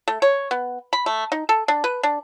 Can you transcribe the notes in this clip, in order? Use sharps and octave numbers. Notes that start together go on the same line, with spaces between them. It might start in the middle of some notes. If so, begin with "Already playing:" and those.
A3
C#5
B3
B5
A3
D#4
A4
D4
B4
D4